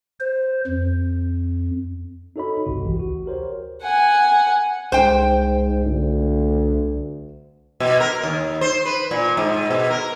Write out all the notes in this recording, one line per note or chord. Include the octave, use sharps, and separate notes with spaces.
C5
F2
D#4 F#4 A4 C#5 D#5 B5
G#1 C#2 G2 C3 F#4
A#1 E3 G4
D2 F#4
G4 A#4 C5 C#5
F#5 G#5
C2 G#2 C5 G5
D2
B2
A#4
D#2
C5
B4
A#2
G#2
B2
A#4